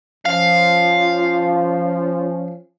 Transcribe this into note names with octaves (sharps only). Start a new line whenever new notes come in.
F3 C#4 F5